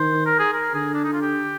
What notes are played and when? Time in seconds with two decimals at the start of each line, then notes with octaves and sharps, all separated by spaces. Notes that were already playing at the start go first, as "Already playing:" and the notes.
Already playing: D#3 C5
0.26 A#4
0.39 G#4
0.54 A#4
0.74 D3 G#4
0.94 D4
1.04 D#4
1.13 F4
1.22 G4